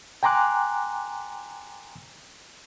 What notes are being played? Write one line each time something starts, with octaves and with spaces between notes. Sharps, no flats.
G5 G#5 A#5 C6 D6 F#6